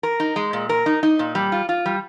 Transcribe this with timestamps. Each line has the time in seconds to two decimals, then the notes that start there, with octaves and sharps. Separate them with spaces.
0.03 A#4
0.20 D#4
0.36 G#3
0.53 A#2
0.69 A#4
0.86 D#4
1.03 D#4
1.19 A#2
1.35 G3
1.52 F4
1.69 F4
1.86 G3